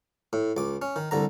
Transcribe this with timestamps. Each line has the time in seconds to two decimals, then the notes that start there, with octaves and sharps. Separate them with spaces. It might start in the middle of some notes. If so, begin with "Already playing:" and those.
0.33 A2
0.57 C#2 D6
0.82 C#4
0.96 D#3
1.11 C2 D3 A#5